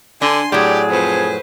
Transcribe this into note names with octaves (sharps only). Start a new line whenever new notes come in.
D3 D4 G#5 C6
A2 F#3 G4 G#4 D5
F2 B4 C5